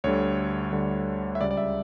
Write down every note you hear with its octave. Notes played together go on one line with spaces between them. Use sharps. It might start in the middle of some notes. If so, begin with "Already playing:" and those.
D2 D3 G3 C#5
D2 D3 G3
E5
C#2 C#3 G3 D5
D5
E5